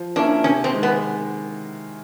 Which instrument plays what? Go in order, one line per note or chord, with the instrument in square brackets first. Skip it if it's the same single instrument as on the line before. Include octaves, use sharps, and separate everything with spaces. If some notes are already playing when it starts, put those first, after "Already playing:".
Already playing: [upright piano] F3
[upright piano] A#3 C#4 E4 [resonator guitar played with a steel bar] D4
[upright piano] C3 [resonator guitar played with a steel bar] C#4
[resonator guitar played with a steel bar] C4
[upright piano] D#3 G#3
[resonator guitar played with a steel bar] B3